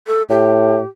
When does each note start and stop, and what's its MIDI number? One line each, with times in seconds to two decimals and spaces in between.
0.07 0.23 69
0.30 0.79 45
0.30 0.86 67